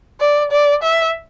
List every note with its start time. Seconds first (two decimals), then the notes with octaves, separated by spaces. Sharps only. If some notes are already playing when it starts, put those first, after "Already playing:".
0.20 D5
0.51 D5
0.83 E5